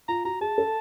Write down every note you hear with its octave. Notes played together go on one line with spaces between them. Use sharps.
F4 A#5
F#4 A#5
G#4 A5
A4